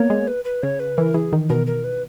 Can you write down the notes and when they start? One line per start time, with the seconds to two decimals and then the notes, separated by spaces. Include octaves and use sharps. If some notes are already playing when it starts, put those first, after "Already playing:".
Already playing: A#3 B3 C#5
0.10 G#3
0.27 B4
0.45 B4
0.63 C#3 C#5
0.80 B4
0.97 E3 A#4
1.14 E3 G#4
1.33 D#3
1.49 B2 A#4
1.67 A#4
1.84 B4